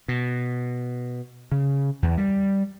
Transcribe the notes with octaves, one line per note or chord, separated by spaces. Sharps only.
B2
C#3
E2
G3